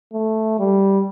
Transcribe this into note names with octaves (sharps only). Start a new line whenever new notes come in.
A3
G3